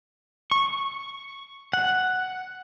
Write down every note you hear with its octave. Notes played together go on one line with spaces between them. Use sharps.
C#6
F#5